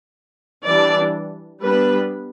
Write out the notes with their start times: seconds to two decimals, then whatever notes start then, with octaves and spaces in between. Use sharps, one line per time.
0.64 E3 G3 D4 D5
1.61 G3 B3 D4 B4